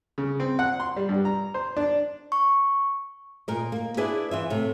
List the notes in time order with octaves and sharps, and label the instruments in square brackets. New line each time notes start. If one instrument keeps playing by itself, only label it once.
[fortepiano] C#3
C4
F#5
C6
G3
G2
A#5
C5
D4
[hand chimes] C#6
[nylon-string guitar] A#2 A#4 D#5
A#3
D4 E4 G#4 B4 D5
E3 F4 E5
A2 C3